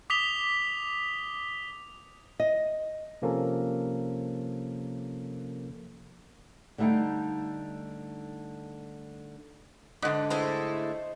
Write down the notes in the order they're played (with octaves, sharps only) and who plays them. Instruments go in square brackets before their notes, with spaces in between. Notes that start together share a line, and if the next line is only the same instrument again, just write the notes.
[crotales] D6 D#6 B6 F7 G7
[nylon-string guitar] D#5
[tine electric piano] C3 F3 A#3 C#4 A4 A#4
[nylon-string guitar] D3 G3 A3 D#4 F5 G5
[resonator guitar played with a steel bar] G#2 D3 [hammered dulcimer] D#5
[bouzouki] G#3 A3 E4 [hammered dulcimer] C5